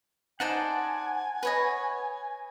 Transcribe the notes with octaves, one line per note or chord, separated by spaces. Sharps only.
D#4 C5 D5 F#5 G#5 A5
B4 C#5 D#5